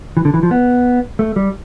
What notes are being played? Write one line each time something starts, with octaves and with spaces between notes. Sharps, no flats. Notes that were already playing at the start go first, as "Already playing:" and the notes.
E3
D3
E3
F3
B3
A3
G3